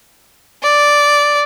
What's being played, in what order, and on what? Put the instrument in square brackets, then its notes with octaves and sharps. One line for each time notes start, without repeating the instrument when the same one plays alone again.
[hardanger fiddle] D5